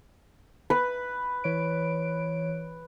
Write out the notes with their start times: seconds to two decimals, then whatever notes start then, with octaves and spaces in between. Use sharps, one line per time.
0.70 B4
1.44 E3 C#5 D7